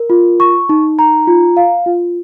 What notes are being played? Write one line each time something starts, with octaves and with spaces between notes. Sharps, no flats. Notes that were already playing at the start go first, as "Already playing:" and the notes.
Already playing: A#4
F4
C#6
D#4
A#5
F4
F5
F4